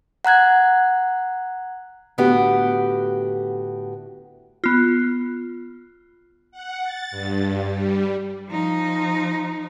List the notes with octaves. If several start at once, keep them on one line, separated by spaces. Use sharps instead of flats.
F#5 A#5 F#6 G#6
A2 D3 B3 F#4 G4
B3 F4
F#5
A6
G2
G3
F3 D#4